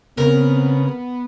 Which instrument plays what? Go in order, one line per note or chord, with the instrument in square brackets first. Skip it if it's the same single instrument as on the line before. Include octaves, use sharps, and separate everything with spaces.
[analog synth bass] C#3 [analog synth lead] B3 [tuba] C4 [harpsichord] A#4